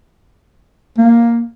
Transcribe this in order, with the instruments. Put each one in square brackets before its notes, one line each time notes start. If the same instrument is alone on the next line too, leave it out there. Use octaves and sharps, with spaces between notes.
[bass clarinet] A#3